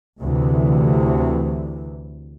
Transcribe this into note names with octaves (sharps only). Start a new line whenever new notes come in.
D2 C3 E3